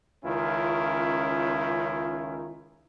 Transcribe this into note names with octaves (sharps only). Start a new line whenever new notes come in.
C#2 D#3 C#4 E4 F4